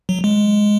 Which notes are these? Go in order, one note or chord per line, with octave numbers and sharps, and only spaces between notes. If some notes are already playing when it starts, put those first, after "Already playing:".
F#3
G#3